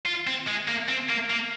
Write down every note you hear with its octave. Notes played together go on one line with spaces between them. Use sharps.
F4
C4
G#3
A#3
C4
A#3
A#3